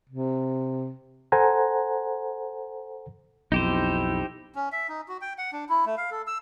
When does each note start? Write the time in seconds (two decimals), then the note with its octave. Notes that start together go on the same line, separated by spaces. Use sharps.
0.09 C3
1.32 A4 C5 F#5 G#5 A#5
3.52 B1 F2 D#4 E4 G4 C5
4.55 C#4
4.72 E5
4.89 D#4
5.08 F#4
5.21 G5
5.38 F#5
5.53 D4
5.69 E4
5.86 A3
5.98 F5
6.11 A4
6.27 E6